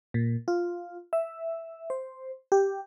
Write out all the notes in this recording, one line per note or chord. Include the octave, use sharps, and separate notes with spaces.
A#2
F4
E5
C5
G4